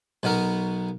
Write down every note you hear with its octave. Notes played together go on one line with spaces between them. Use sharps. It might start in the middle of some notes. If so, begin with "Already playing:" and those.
B1 B2 B3 A#4